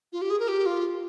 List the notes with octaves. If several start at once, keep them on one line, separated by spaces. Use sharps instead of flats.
F4
G4
G#4
A#4
G4
F4